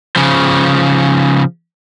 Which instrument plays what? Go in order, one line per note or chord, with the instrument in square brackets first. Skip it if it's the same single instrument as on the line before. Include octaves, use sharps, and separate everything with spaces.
[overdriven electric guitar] C#3 F3